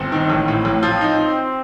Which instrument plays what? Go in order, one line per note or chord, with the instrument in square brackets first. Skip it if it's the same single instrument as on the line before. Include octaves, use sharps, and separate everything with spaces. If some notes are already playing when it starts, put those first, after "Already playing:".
Already playing: [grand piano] G1 [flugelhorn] C4
[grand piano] D#3
A1
A2
A1
F3
D#4